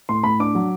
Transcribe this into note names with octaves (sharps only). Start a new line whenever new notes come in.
A2 C6
A2 B5
D4 D6
F#3